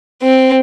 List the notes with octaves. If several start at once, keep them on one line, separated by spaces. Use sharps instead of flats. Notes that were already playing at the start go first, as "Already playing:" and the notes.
C4